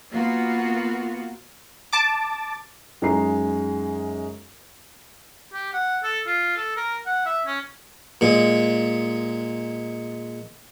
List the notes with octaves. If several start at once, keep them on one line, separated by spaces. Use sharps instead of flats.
A#3 B3 F4 F#4
A5 D6
F#2 G#3 D#4 A#5 C7
G4
F#5
A4
F4
A4
A#4
F#5
E5
C#4
A#2 G#3